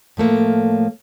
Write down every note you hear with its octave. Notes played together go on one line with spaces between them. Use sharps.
A2 F3 A3 A#3